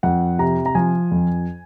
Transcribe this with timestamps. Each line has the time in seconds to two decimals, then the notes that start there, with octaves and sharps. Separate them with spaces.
0.03 F2 F#5
0.39 C3 A#5
0.66 A#5
0.75 F3 G#5
1.12 F2